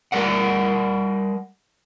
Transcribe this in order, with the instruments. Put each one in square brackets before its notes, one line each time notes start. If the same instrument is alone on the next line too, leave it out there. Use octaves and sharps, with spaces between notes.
[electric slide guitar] G3 A#4 D5 F#5